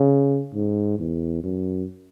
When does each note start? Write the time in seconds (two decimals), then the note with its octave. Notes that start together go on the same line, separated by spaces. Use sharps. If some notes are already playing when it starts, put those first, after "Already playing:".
Already playing: C#3
0.54 G#2
0.99 E2
1.43 F#2